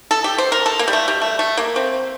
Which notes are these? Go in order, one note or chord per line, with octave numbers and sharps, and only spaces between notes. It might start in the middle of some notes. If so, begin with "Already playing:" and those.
A4
G4
C5
A#4
A4
A#3
G3
A3
G3
A3
A3
A#3
C4